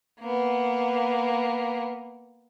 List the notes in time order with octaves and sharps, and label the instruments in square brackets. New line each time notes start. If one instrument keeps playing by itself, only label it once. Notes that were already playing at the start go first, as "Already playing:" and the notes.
[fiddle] A#3 B3